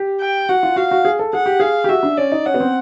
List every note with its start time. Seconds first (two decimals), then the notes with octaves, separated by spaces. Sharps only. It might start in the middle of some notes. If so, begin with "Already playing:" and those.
Already playing: G4
0.21 G5
0.49 F#4 F#5
0.63 F4
0.76 F#4 F5
0.91 F#4
1.05 G#4
1.19 A4
1.33 G#4 F#5
1.46 G4
1.60 G#4 F5
1.84 G4
1.89 F#4 E5
2.03 D4
2.17 C#4 D5
2.32 D#4
2.46 C#4 F#5
2.54 B3
2.60 C4